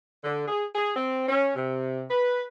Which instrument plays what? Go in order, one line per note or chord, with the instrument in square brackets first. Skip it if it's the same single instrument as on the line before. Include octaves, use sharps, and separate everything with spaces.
[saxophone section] D3
G#4
G#4
C4
C#4
C3
B4